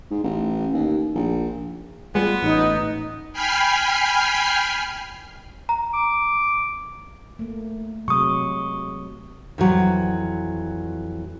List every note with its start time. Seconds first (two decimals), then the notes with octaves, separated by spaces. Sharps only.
0.10 G#2
0.24 A1
0.73 D#2
1.15 A#1
2.15 G3 G#3 B3 F4
2.43 A1 D#4
3.33 G5 G#5 B5 F6 C7
5.69 A#5
5.94 D6
7.39 A3 A#3
8.08 C3 F#3 G#3 C#6 D#6
9.58 F2 E3 F#3